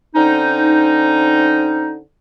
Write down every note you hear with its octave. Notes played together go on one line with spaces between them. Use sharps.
D3 C4 C#4 D#4